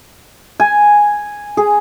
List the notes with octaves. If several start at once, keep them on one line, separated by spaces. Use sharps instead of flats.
G#5
G#4